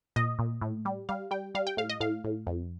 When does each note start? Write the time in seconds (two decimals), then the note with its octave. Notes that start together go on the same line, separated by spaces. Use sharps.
0.16 A#2 D#5
0.39 A#2
0.62 A2
0.85 G3
1.09 G3 F5
1.31 G3 G5
1.55 G3 F5
1.67 G5
1.77 A2 F5
1.90 D#5
2.00 A2 F5
2.24 A2
2.47 F2